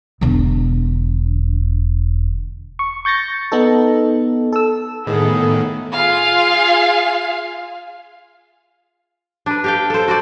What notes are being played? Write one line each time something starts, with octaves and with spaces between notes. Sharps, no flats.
E1 D3
C#6
C#6 G6 A6 A#6 C#7
B3 D#4 A4
A4 E6
A2 D#3 B3 G#4 A4
F4 G#4 F5
D4 B4
G4 F5 G5
A4 C5
F#4 C5 D5